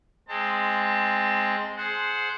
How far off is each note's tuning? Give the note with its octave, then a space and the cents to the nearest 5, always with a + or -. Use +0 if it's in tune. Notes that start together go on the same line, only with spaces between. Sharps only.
G#3 +0 C4 +0 A5 +35
G#4 +20 C5 +0 F#5 -5